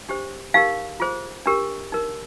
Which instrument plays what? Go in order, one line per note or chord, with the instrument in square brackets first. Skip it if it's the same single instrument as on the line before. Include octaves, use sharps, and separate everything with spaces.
[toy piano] D4 G4 C5
D#4 G4 A#4 F5
F4 G#4 C5
D4 G4 A#4
D#4 A#4